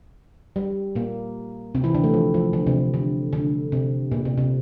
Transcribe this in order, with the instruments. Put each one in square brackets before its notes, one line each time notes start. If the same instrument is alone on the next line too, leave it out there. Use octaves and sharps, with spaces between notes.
[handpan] G3
A#2 A#3
C3 C4
E3 E4
D3 D4
A3
F3
F3
D3
C3
D3
D3
C3
A#2
C3
C3